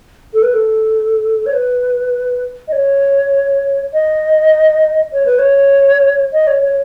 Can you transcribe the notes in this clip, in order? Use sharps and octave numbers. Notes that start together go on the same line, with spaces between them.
A4
B4
A4
C#5
B4
D#5
C#5
D#5
C#5
B4
C#5
D#5
C#5
C#5